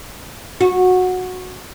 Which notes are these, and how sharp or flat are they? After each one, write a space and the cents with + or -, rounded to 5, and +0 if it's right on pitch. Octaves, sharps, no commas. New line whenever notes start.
F#4 -15